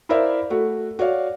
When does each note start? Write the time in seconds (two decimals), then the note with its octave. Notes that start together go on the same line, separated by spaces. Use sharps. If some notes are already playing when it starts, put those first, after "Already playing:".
0.09 E4 A#4 C5 D5 E5 F5
0.50 A3 F#4
0.99 F#4 C#5 D5 F5